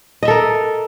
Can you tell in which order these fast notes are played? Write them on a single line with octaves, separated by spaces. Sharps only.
D#5 E5 A4 A#4